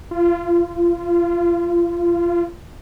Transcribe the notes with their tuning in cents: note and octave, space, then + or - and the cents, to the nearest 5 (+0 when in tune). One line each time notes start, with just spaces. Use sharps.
F4 -25